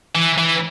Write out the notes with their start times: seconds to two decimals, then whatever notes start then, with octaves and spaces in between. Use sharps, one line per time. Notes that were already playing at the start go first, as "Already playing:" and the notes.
0.15 E3
0.38 E3